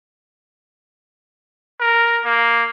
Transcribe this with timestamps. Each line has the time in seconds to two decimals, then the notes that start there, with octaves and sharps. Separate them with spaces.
1.80 A#4
2.24 A#3